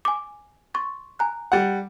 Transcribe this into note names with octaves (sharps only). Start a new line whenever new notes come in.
G#5 D6
C6 C#6 A6
G#5 A#5 F#6
G3 F#5